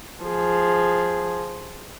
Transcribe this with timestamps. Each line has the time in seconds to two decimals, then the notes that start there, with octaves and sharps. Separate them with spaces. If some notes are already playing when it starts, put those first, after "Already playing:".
0.24 F3 G#4